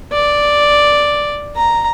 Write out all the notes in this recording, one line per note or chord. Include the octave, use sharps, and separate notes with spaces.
D5
A#5